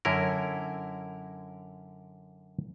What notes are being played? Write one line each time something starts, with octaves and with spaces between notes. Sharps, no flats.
F#2 D3 C#4 E4 A#4